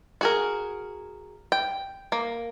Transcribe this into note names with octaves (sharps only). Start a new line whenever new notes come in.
F#4 G#4 A#4
G5
A#3